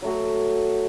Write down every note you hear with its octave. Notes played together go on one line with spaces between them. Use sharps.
F#3 A3 F#4